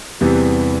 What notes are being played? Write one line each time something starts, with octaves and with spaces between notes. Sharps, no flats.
E2 C3 E3 G3 B3